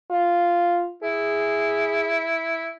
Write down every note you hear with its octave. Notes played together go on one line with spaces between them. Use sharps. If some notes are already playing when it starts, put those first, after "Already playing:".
F4
E4 G#4